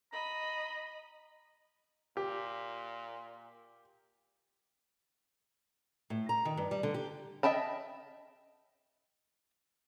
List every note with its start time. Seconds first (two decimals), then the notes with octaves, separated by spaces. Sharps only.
0.13 D#5 A#5 B5
2.17 A#2 G4
6.10 A2
6.29 A#5
6.45 D#3
6.57 G2
6.71 G3
6.83 D3
6.94 G4
7.43 D#5 E5 G5 A5 B5